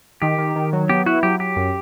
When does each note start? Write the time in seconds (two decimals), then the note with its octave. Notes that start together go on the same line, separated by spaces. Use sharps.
0.22 D#3 G4
0.38 D#3
0.56 D#3
0.73 F#3
0.89 B3 G4
1.06 E4 F#4
1.23 F#3 G4
1.39 F#3 G4
1.56 F#2